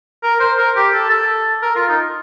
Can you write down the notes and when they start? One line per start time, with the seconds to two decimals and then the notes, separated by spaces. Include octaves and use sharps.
0.23 A#4
0.40 C5
0.58 A#4
0.76 G4
0.93 A4
1.10 A4
1.62 A#4
1.76 F4
1.89 D#4